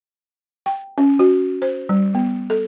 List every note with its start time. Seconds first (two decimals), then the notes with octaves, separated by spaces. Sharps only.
0.66 G5
0.98 C#4
1.19 F#4
1.62 C5
1.89 G3
2.15 B3
2.50 A4